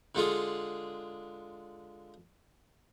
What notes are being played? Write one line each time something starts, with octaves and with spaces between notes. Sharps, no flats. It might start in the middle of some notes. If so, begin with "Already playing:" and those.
D3 G#3 F4 G#4